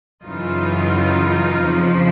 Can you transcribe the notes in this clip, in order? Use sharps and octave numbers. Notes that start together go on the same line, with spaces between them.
F#2 C#3 E3 D#4 F4
F2 C#3 F3